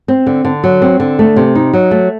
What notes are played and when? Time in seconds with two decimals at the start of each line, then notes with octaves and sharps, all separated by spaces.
0.08 C4
0.27 D3
0.45 D3
0.64 F#3
0.82 C4
1.00 D3
1.19 A3
1.36 C3
1.55 D#4
1.73 F#3
1.91 A3